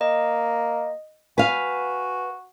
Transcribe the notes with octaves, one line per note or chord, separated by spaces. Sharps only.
A#3 D#5
F#4 B4 F5 G#5